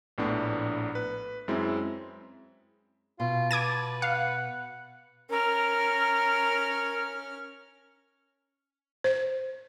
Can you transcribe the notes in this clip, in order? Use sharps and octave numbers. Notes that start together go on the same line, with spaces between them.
A#1 A2 B3 D4
B4
F#2 G#3 C4 E4
B2 F4
B4 A5 D6 G#6 D#7
F5 F#5
C#4 A#4 F6
C5